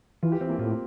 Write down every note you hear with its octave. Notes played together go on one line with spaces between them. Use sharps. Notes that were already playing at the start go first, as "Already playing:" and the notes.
E3 F4
G4
E3 C4
A#3
A2 F4